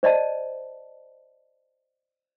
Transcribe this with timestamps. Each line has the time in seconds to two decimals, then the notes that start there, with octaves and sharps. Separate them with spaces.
0.03 C5 D5 D#5 A5